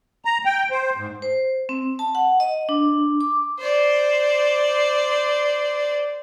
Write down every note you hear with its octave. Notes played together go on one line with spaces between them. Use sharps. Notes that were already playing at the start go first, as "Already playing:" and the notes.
A#5
G5
C5
G#2
C5
C4
A5
F#5
D#5
D4
D6
C5 D5